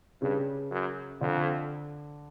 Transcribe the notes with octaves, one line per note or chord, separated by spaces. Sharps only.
G2 C#3
F#2
F2 D3